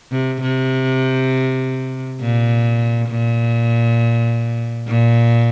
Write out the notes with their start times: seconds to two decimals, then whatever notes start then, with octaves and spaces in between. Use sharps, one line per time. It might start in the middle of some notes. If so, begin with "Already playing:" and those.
0.12 C3
0.42 C3
2.21 A#2
3.10 A#2
4.88 A#2